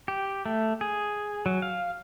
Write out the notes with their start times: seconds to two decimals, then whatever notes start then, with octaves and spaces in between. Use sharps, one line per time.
0.08 G4
0.46 A3
0.81 G#4
1.46 F#3
1.62 F5